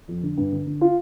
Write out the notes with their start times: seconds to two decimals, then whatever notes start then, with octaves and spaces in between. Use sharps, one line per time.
0.08 F2
0.23 D3
0.37 G2
0.52 D3
0.67 D3
0.81 F4